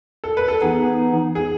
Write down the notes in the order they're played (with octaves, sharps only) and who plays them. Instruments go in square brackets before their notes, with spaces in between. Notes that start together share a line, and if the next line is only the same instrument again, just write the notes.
[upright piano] A4
B4
A4
[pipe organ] E3 B3 D#4 [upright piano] G#4
[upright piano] G#4